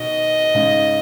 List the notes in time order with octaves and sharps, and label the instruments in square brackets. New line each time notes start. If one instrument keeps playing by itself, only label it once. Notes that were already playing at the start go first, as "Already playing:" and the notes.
Already playing: [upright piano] B2 D#3 [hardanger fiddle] D#5
[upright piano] G#2 C#3